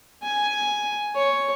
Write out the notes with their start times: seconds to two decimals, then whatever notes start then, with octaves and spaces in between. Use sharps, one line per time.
0.23 G#5
1.15 C#5